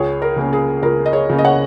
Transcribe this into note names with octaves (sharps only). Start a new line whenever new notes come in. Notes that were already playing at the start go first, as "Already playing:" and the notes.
Already playing: C#2 G#4 C#5
A#4
C#3 A#3 C#4
G#4
C#2 A#4
D#5
G#4 C#5
C#3 A#3 C#4
D#5
C#5 F#5